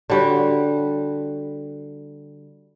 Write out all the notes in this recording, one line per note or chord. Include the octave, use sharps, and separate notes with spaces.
D3 G3 F#4